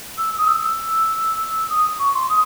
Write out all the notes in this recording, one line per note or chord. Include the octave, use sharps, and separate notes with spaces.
E6
D#6
E6
D#6
C#6
C6
D#6